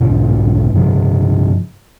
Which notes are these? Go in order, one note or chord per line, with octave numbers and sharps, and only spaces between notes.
D1 B1 G#2 B2
G2 C3 E3 F3